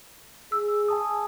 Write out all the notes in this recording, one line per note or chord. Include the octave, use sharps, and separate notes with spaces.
G#4 E6
G#5 A5 D#6